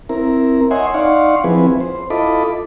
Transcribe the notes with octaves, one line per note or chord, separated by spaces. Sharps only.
C4 E4 A#4
C#5 D#5 E5 F#5 G#5 C6
D#4 D5 F5 F#5 C6 C#6
F3 C4 E4 G#4 B4
C5
E4 F4 A4 D#5 B5 D6